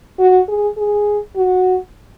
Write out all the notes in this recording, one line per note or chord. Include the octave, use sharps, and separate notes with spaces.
F#4
G#4
G#4
F#4